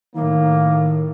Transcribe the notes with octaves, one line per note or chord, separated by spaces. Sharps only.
A2 D#3 A#3